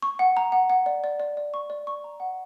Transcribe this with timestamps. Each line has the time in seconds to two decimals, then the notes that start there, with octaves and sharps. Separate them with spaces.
0.02 C#6
0.19 F#5
0.37 A#5
0.52 F#5
0.70 F#5
0.86 D5
1.04 D5
1.20 D5
1.37 D5
1.54 C#6
1.70 D5
1.87 C#6
2.04 A#5
2.20 F#5